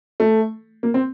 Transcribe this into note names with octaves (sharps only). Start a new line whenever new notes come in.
A3
A#3
C4